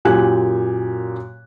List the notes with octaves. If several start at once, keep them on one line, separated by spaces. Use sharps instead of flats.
F#2 A#2 G4 G#5 F#6